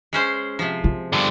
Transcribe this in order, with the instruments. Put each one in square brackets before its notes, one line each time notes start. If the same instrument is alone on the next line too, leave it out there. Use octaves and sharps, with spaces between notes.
[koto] G#3 C#4 C5
C3 F3
[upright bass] F4
[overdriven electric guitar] G2 D3